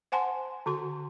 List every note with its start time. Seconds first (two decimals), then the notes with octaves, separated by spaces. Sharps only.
0.12 C5 F#5 G#5 A5 C6
0.66 D3 F#4 C6